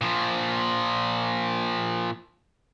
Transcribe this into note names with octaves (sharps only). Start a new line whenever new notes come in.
A#2 F3